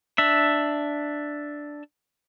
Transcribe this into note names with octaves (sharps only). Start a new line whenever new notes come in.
D4 E5